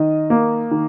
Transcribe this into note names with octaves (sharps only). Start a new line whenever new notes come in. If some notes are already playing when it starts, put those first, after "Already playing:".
Already playing: D#3 D#5
A#3
D#3